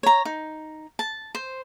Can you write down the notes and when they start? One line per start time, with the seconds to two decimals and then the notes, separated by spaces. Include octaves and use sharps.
0.03 C#5 A#5
0.25 D#4
0.99 A5
1.35 C5